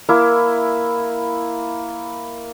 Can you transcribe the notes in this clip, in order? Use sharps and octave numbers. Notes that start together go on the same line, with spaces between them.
A#3 E4